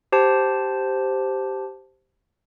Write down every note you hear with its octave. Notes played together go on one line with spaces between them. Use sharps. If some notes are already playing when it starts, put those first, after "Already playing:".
G4 C5 A5